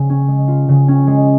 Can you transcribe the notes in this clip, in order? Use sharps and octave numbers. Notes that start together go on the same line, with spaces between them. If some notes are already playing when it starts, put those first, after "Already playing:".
Already playing: C#3
C#4
G#3
F4
C#3
C#4
G#3